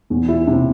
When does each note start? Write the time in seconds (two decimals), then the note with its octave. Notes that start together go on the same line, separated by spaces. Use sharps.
0.10 E2
0.29 E4
0.47 C3